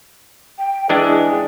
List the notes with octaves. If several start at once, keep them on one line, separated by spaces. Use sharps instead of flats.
G5
E3 G#3 D4 G#4